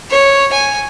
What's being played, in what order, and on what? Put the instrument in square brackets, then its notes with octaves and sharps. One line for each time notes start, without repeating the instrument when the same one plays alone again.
[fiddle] C#5
G#5